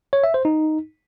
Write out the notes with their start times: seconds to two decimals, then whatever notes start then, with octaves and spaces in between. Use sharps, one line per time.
0.13 C#5
0.24 E5
0.34 C5
0.45 D#4